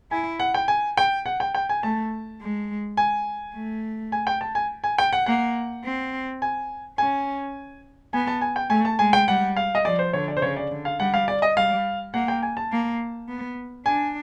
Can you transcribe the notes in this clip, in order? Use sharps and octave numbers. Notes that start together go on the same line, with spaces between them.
E4 G#5
F#5
G5
G#5
G5
F#5
G5
G5
G#5
A3 A5
G#3
G#5
A3
G#5
G5
A5
G#5
G#5
G5
F#5
A#3 F#5
C4
G#5
C#4 G#5
B3 G#5
A5
G#5
G5
A3 G#5
A5
G#3 G#5
G5
G3 F#5
F5
D#5
F3 D5
C5
D3 C#5
D5
C5
C#3 C#5
D5
D3
F5
G3 F#5
F5
D5
D#5
G3 F5
A#3 F#5
G5
G#5
A5
A#3
B3
D4 G#5